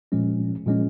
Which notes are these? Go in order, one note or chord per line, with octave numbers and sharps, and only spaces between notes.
A#2 F3 G#3 C#4
A#2 F3 G#3 C#4